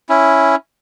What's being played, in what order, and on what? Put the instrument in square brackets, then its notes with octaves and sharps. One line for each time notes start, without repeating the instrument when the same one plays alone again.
[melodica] C#4 E4